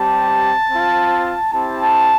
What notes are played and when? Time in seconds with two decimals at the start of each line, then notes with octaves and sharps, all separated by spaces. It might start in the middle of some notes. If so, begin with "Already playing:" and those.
Already playing: G3 C4 G4 A5
0.70 C4 F4
1.52 C4 E4 G4 A5